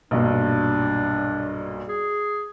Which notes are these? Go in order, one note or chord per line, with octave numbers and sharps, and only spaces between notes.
B1 G2 A#2 D4
G#4